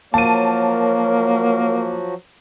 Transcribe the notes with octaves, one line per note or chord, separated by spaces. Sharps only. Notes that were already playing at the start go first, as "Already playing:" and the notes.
F3 F#3 A#3 F#4 A#4 C#5 A5 D#7